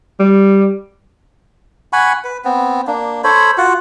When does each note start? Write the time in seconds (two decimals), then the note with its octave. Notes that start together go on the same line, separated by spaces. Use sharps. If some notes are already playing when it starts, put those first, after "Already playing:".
0.20 G3
1.93 F#5 G#5 B5 C#6
2.24 B4
2.45 B3 C4
2.87 A#3 D4
3.24 A4 C5 C#5 B5
3.58 F4 F#4 F#5